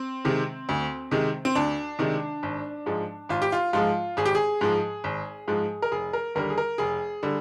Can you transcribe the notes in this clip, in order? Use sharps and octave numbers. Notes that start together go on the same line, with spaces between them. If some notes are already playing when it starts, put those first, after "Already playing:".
Already playing: C4
C3 D#3 G#3
D2
C3 D#3 G#3
C4
D2 D4
C3 D#3 G#3
G#1
G#2 F3 G#3
G#1 F4
G4
F4
G#2 F3 G#3 F4
G#1 G#4
G4
G#4
G#2 F3 G#3
G#1
G#2 F3 G#3
A#4
F1 G#4
A#4
D#2 D3 G3 A#4
G#4
A#4
F1 G#4
D3 G3